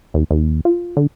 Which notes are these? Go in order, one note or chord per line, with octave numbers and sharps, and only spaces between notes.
D#2
D#2
F4
D3